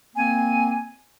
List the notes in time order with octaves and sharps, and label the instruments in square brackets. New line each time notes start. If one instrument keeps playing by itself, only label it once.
[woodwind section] A#3 C4 G#5